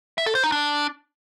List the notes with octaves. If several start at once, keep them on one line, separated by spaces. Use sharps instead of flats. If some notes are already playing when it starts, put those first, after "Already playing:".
E5
A4
C5
D#4
D4